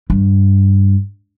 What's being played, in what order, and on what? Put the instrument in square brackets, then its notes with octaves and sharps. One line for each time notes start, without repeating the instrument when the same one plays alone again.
[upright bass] G2